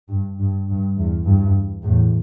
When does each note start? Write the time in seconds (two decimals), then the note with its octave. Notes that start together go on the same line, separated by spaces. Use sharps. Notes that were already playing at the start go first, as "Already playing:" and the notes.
0.10 G2
0.39 G2
0.68 G2
0.97 E2
1.26 G2
1.83 E2 A2